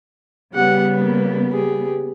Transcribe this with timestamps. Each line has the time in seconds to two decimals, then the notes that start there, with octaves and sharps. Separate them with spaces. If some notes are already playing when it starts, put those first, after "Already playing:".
0.53 C#3 G3 B3 G4 F#5
0.99 A#3
1.52 G4 G#4